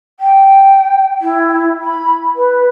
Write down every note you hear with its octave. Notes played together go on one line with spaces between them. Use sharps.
G5
E4
B5
B4